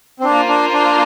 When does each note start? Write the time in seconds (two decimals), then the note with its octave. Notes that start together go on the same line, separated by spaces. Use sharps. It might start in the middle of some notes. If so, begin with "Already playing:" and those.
0.20 C4
0.24 A#3 D4 F4 C5
0.49 D4
0.74 D4